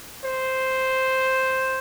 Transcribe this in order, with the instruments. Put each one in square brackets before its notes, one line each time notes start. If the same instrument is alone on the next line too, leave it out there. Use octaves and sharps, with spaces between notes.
[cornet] C5